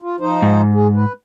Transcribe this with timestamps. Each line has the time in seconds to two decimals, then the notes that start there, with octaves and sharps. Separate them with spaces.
0.02 F4
0.20 F3 D#4 C5
0.42 G#2
0.74 G#4
0.96 B4